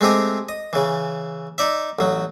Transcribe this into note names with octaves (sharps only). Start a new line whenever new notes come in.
G#3 A3 C4 G4 D#5
D#5
C#3 E3
D#4 D5 E5
A1 F#3